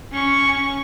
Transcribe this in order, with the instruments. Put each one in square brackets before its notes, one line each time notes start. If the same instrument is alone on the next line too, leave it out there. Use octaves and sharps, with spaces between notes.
[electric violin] C#4 C#6